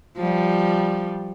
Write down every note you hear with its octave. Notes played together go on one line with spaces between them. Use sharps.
F3 G3